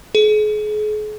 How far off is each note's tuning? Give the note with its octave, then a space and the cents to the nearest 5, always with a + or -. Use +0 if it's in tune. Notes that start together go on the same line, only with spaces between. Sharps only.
G#4 +40